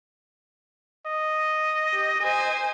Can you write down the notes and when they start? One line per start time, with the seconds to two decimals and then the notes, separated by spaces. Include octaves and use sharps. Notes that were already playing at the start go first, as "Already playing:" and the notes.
1.07 D#5
1.93 G4
2.22 C5 G#5